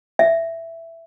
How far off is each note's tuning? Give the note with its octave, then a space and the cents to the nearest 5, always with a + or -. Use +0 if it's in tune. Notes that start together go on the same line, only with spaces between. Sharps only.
E5 +5